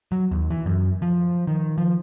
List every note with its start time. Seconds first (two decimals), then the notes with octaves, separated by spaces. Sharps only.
0.12 F#3
0.31 D#2
0.50 E3
0.66 F#2
1.02 F3
1.48 D#3
1.78 F3